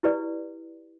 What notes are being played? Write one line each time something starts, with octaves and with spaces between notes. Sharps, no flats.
E4 G4 B4 D5